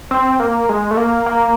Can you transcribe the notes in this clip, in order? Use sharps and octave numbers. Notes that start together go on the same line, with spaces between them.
C4
A#3
G#3
A3
A#3
A#3